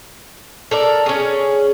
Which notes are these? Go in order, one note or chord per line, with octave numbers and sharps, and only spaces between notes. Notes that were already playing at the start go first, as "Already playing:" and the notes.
A4 A#4 D5
C#4 G#4